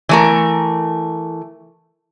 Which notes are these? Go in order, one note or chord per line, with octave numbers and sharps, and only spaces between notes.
E3 A3 A#4